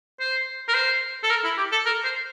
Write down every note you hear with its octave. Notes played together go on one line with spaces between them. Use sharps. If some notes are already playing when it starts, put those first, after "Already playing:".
C5
A#4
C5
A4
A#4
E4
G4
A4
A#4
C5